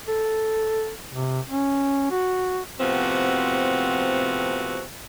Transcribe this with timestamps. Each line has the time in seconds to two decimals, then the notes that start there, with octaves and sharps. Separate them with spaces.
0.08 A4
1.13 C3
1.48 C#4
2.11 F#4
2.80 A2 C3 F3 B3 C4 F#4